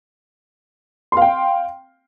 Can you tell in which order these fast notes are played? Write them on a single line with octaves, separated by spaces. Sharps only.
C6 F5 G5